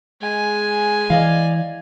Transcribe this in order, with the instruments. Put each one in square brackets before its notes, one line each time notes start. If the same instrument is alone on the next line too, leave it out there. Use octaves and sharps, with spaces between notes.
[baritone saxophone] G#3 [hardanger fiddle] G#5
[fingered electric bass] E3 [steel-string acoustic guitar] D5 D#5 F5